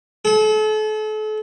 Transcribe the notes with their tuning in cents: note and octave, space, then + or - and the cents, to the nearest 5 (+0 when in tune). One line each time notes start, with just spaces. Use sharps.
A4 -40